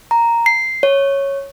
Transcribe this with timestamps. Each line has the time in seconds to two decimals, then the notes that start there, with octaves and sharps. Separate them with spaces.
0.11 A#5
0.46 C7
0.83 C#5